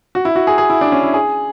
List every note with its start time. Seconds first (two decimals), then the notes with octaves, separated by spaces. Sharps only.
0.15 F#4
0.25 E4
0.36 F#4
0.47 G#4
0.58 G#4
0.70 E4
0.81 D4
0.92 C#4
1.03 E4
1.14 G#4